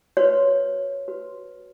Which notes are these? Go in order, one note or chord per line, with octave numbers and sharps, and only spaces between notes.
F#4 B4 C#5
F#4 B4